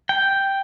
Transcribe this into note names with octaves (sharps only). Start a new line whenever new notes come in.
G5